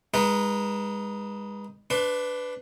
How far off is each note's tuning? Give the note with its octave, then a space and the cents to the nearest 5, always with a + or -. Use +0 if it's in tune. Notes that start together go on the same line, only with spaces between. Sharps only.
G#3 -30 D#4 +0 B4 -25
D4 +0 B4 +15 C6 +25